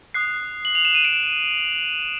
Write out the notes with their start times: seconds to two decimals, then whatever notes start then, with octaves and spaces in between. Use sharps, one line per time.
0.14 D#6 F#6 C7
0.65 F#7
0.75 F7
0.85 E7
0.95 D#7
1.05 D7